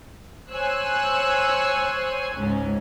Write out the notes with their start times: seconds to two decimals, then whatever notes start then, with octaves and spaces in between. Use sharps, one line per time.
0.51 C5 C#5 G#5 E6 F#6
2.34 C#2 G#2 C#4